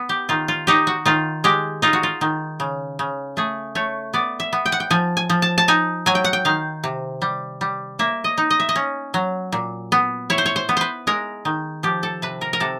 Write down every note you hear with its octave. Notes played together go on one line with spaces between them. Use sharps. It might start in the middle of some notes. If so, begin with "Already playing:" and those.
Already playing: B3
G4
D#3 F4
F4
D#4 G4
F#4
D#3 F4
G#3 G4
D#4 F4
F#4
F4
D#3
C#3
C#3
A3 G#4
A3 C#5
B3 D5
E5
B3
G5
F#5
G5
F3 G#5
G#5
F3
A5
A5
D#4 G#5
F#3 G#5
G5
F#5
G5
D#3 F5
C3
G3
G3
A#3 E5
D#5
D#4
D#5
E5
D#5
C#4
F#3
A#2
B3
E4 C#5
C5
C#5
C5
B3
B4 C5
G#3 A#4
D#3
F3 G4
A4
C3 B4
A#4
A#4
C3 A4